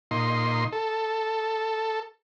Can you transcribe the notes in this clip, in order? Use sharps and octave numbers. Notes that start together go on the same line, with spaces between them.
A#2 D#4 C6
A4